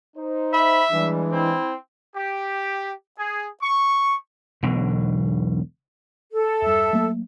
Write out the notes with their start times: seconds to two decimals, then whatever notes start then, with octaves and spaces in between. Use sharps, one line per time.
0.17 D#4 C5
0.53 E5 B5
0.91 E3 G3 G#3 D4
1.32 C4 E4
2.16 G4
3.19 G#4
3.62 C#6
4.63 E1 B1 B2 D3
6.33 A4
6.62 E2 G2 E5
6.93 F#3 A3 A#3